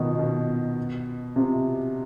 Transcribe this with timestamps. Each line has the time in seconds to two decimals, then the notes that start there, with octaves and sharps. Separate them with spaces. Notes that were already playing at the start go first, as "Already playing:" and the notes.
Already playing: B2 D#3
0.19 B2
1.36 C3